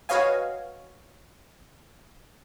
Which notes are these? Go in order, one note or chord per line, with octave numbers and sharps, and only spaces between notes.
F#4 B4 C#5 D#5 F5 G#5